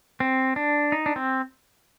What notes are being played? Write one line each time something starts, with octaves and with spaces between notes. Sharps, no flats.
C4
D4
D#4
D4
C4